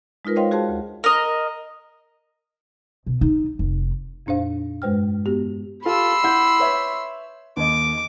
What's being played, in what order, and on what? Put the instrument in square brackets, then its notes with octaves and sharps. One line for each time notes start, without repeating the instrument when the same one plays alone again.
[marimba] G#3 D#4 F4 A#4 B4
C5 C#5 D#5 F5 G5 C6
F#4 G#4 C5 F5 A5 C6
D2
[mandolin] A#4 D#5
[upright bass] B2
D#4
F1
[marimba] F2 A#2 D4 C5 F5
G2 G#3 B4 C5 G5 F6
B3 F#4 G4
[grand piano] F4 G4 A4 [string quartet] B5 C6 E6
[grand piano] E4 F#5 G6
B4 C#5 E5
[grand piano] D#2 D#5 [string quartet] D6